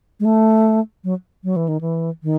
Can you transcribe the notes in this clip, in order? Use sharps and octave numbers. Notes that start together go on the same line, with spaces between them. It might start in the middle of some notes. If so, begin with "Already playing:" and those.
G#3
A3
F#3
F#3
E3
D#3
E3
D#3